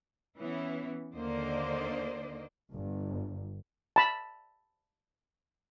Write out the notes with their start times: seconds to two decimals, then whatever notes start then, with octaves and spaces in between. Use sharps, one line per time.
0.38 E3 B3 C#4 E4
1.15 D#2 D3 A#3 C5 D5 D#5
2.74 G1
3.96 A5 B5